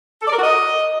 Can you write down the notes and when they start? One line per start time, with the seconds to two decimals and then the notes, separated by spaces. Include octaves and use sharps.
0.22 A4
0.27 D5
0.32 A#4
0.38 F#4
0.43 D#5